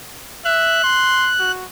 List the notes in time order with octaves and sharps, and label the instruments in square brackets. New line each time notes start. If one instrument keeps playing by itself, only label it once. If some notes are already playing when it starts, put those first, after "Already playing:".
[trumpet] E5 [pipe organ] F#6
[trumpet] C6
F#4